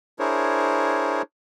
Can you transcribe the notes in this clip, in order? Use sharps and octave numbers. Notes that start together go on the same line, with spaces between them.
D4 E4 G#4 A#4 C5 C#5